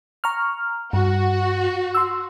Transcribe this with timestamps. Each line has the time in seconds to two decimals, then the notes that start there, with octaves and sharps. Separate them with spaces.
0.24 A#5 C#6 F6
0.93 G2 F#4
1.95 C6 E6